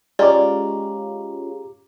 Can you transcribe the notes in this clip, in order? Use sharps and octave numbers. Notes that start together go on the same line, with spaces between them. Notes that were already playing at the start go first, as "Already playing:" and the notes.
G#3 C#4 F4 G4 D5 A#5 D6